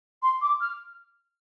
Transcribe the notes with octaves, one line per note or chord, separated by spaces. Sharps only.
C6
D6
F6